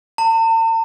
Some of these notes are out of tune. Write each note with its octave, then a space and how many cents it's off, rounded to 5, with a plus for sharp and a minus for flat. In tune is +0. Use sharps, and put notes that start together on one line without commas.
A5 +45